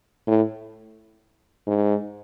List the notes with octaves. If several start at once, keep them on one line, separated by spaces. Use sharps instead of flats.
A2
G#2